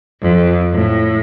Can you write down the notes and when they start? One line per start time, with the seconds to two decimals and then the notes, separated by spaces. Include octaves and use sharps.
0.22 F2
0.73 A2